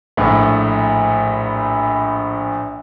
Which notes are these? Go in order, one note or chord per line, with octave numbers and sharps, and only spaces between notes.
A#1 A2